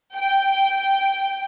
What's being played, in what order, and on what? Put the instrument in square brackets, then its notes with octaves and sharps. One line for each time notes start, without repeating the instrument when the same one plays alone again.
[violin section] G5